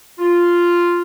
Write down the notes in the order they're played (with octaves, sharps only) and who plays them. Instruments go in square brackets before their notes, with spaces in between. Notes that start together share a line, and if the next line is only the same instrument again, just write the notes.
[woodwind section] F4